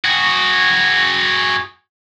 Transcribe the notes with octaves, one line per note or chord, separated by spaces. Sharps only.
F#4 G#4